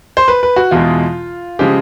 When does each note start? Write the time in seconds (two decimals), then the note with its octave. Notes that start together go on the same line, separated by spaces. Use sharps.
0.17 C5
0.28 B4
0.43 B4
0.56 F#4
0.71 E2 B2 G#3 F4
1.59 C#3 F3 G#3 G4